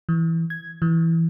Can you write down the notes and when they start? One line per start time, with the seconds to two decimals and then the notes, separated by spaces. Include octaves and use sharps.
0.09 E3
0.50 G#6
0.82 E3